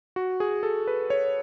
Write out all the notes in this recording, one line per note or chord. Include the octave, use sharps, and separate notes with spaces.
F#4
G#4
A4
B4
C#5